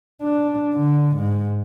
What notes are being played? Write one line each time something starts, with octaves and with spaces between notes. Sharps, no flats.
D4
D3
G#2